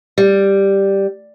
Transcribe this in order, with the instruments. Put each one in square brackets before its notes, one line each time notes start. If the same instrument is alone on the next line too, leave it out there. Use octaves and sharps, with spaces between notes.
[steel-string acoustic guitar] G3